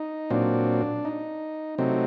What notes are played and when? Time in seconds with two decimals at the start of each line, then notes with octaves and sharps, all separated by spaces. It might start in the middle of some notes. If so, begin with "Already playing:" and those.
Already playing: D#4
0.30 A#2 F#3 C4 D4
1.05 D#4
1.78 C3 F#3 A3 C4 D#4